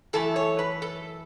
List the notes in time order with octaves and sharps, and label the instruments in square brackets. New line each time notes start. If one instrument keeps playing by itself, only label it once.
[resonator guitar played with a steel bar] F#2 E3 A3 A4
C#5
B4
A4